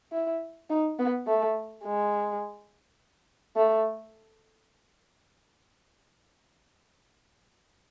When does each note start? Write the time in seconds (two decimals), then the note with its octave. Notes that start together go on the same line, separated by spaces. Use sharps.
0.13 E4
0.70 D#4
0.99 B3
1.27 A3
1.84 G#3
3.56 A3